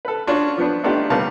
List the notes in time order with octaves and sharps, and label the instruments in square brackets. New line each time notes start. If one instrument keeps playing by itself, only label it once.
[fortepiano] A4 B4
C#4 D4 F4 F#4 C#5
F3 B3 D4
A3 B3 D4 D#4 F4 G4
C#3 G3 B3 A#4 F5 A5